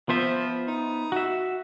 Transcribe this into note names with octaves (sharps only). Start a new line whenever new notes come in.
F3 B3 C5 E5
D#4
F#4 E5